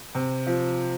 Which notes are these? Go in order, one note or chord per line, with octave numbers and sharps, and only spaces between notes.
C3
F3